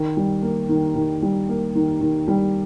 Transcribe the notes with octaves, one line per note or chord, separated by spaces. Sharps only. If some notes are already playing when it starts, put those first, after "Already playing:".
Already playing: D#3
G3
A#3
D#3
D#3
G3
A#3
D#3
D#3
G3